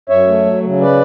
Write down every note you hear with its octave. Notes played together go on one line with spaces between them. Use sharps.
F#2 C#5 E5
A3
F#3
C#3
B4 D5